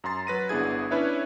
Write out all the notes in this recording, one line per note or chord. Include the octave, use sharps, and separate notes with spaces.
F#2 A#5 C6 A6
F#3 B4 A#6 D#7
G1 B3 D4 E4 G#4 G#6
C#4 D4 E4 B4 C#5 E5